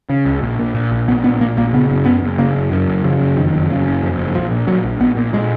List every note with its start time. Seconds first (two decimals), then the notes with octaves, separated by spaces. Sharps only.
0.10 C#3
0.26 C#2
0.42 A#1
0.59 A#2
0.75 A#2
0.91 A#1
1.08 A#1 B3
1.24 A#2 B3
1.40 A#2 A#3
1.56 A#1 A#3
1.73 C#3 B3
1.89 F#1
2.06 F#2 B3
2.22 F#1
2.38 C#3 A#3
2.55 F#1
2.72 F#2
2.88 F#1
3.04 C#3 F3
3.20 F#1
3.37 F2 D#3
3.53 F#1
3.70 C#3
3.87 F#1
4.03 F2
4.19 F#1
4.35 A#1 F3
4.51 A#2
4.67 A#2 F#3
4.84 A#1
5.00 A#1 B3
5.16 A#2
5.33 A#2 G#3